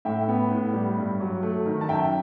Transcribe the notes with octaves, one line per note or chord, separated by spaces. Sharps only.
A2 E5 G5
B3
A2
G3
G2
F#3
A3
D#3
A5
F#2 E5 G5